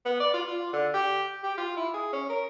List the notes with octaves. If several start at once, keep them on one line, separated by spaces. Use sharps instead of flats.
B3
D5
F4
F4
D3
G4
G4
F4
E4
G#4
C#4
A#4